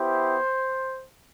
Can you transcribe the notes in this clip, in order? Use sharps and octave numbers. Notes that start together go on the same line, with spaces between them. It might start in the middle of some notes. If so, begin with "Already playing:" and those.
Already playing: B3 E4 G4 C5